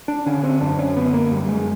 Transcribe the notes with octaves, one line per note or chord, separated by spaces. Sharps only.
D4
D3 C#4
C4
F#2 D4
C#4
D3 B3
A#3
F#2 G3
G#3